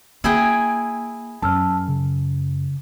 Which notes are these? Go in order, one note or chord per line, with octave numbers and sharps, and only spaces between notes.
A#3 E4 G#4 G5
F#2 A5 E6 F6
C#3